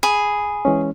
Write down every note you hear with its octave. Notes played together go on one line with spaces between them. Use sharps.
G#4 B5
E3 G#3 C#4